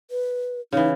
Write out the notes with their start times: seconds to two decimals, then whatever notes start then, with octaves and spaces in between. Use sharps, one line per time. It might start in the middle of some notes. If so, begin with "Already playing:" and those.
0.11 B4
0.72 C#3 E3 D#4